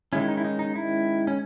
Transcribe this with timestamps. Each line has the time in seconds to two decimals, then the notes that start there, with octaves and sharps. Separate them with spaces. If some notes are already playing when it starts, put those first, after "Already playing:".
0.13 D#3 G#3 C#4 E4
0.28 D#4
0.37 E4
0.45 D#4
0.59 D#4
0.75 E4
1.27 C#4